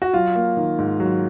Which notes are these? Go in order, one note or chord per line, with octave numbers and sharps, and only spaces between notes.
F#4
F#3 F4
A#3
D#3
G#2
F#3